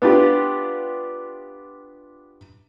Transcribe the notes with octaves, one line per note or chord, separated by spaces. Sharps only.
B3 D4 F4 G4